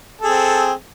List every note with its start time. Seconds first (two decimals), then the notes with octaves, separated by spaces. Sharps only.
0.21 A4
0.24 G#4
0.27 C4